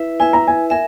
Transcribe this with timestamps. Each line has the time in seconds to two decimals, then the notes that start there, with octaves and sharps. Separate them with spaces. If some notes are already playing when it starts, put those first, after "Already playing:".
Already playing: E4 B4 E5
0.20 E4 B4 E5 G#5
0.33 A#5
0.47 G#5
0.70 A#4 E5 G#5